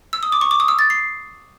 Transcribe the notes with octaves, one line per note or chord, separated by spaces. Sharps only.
E6
D#6
D6
C#6
D6
D#6
E6
A6
C7